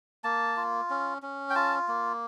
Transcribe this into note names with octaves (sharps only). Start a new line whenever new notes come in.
A#3 A5
F4
C#4
C#4
G5
F4 A5
A#3